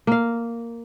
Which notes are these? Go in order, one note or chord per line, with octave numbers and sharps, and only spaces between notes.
A#3 F5